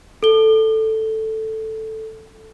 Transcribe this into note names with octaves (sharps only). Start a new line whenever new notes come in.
A4 G7